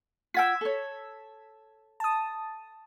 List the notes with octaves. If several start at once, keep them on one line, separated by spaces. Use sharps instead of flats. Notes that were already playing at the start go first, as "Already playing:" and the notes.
F4 F#5 G5 E6 G#6 B6
A4 C#5
A5 D#6